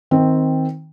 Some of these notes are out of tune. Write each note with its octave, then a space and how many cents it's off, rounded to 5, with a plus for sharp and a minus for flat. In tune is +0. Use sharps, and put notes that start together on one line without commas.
D#3 +20 C4 +0